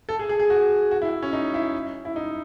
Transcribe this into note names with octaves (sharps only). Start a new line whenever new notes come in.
A4
G#4
G#4
G#4
F#4
F#4
E4
C#4
D#4
E4
E4
D#4